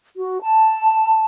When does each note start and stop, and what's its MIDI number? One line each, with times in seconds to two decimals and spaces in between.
0.16 0.41 66
0.42 1.26 81